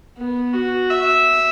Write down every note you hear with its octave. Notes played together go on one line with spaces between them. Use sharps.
B3
F#4
E5